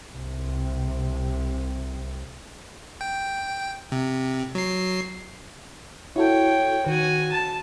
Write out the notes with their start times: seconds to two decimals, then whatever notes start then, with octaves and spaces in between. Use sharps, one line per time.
0.10 C2 C3
3.01 G5
3.92 C3
4.55 F#3 C7
6.16 E4 F#4 A4 C#5 G5
6.86 D#3 F#4 G#5
7.31 A5